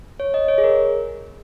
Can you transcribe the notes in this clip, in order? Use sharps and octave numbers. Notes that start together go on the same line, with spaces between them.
C#5
D#5
C#5
G#4
A#4